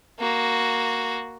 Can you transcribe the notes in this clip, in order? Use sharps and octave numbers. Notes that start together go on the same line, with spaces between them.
A#3 F#4